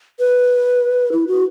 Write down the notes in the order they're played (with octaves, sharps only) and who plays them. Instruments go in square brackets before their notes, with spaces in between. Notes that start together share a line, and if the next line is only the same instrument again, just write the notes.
[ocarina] B4
E4
F#4